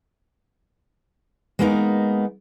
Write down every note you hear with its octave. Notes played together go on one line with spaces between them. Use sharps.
G#3 A#3 B3 D4 D#4